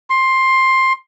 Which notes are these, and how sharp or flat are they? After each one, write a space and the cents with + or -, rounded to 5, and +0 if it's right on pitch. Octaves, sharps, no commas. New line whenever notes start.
C6 +15